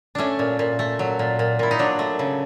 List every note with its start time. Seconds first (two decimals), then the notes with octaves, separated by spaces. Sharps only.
0.15 A3 C#4 D4
0.39 A#2
0.59 A#2
0.79 A3
0.99 F#3
1.19 A#2
1.39 A#2
1.59 A#2 E4
1.71 D#4
1.79 F#3 D4
1.99 A3
2.19 C#3